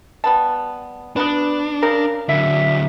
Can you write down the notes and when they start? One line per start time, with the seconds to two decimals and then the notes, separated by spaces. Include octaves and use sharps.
0.24 G3 B3 A5
1.16 B3 D4 F#4 B4
1.83 C#3 A#4
2.29 D3 F#3 E5